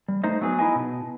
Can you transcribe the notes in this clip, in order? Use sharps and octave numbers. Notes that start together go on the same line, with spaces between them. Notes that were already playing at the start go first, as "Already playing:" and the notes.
G3
A3 D#4 C5 D#5
F#3 B3 G#4 A4 B4
D#4 E4 D#5 G#5
B2